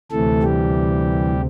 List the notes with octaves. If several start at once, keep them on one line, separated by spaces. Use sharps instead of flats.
D2 C3 E3 A3 A4
G3 G4